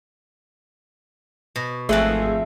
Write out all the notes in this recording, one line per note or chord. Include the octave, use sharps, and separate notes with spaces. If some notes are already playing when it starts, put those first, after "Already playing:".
B2
G#1 F2 A3 G#4 E5 F#5 C6